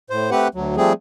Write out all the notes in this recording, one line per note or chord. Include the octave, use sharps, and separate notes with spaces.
A2 C5
A3 C4 G4 B4 F#5
D2 F#3
F3 G3 A3 C4 G#4